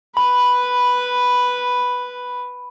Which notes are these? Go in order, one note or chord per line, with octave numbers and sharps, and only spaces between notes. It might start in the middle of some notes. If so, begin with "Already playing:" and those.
B4 B5